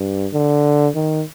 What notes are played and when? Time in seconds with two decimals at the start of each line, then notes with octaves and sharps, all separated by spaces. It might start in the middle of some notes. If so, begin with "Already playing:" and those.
Already playing: G2
0.33 D3
0.95 D#3